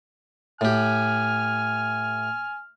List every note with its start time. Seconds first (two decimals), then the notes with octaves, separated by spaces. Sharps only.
0.61 A2 G4 G#5 F6